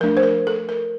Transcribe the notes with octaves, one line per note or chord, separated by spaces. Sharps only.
F3 A3 D4 A#4
C5
A#4
A4
A#4